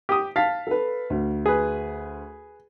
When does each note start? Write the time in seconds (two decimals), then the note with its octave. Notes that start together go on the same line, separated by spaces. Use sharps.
0.09 G4 D#6
0.36 F5 A5 A6 B6
0.67 A4 B4
1.10 D2
1.46 G#4 B4